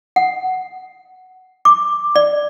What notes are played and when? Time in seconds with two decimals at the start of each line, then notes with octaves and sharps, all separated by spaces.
0.16 F#5
1.65 D6
2.16 D5